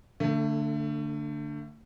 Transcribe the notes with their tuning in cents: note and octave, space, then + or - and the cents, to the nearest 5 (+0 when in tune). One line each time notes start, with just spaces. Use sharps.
D3 +0 A3 +30